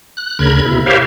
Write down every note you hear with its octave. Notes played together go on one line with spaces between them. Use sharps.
F#6
D2 C#3 A#4 B5 G#6
B2 E4
G4 A#4 C5 C#5 E5 F5